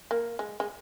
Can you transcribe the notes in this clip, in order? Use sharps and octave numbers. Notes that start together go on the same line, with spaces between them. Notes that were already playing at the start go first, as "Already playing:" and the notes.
A#3
G#3
G#3